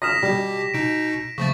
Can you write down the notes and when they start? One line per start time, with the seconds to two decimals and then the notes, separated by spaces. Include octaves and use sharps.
0.02 D#6 F6 A#6 B6 E7
0.23 B2 G3 G4
0.74 B2 D#4 D7
1.38 C#3 F3 A3 C#6 A6